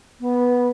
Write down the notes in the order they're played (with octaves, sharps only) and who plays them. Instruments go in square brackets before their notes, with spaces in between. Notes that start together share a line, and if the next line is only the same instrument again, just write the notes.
[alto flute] B3